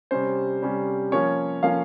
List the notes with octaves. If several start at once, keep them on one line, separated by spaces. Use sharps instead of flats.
C3 G3 C#4 C5
C3 G3 C#4
F3 A#3 C#4 C#5
F3 A#3 C#4 F5